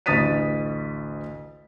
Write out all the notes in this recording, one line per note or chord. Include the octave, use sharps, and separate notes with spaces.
A1 D2 D#6 A6 B6 D#7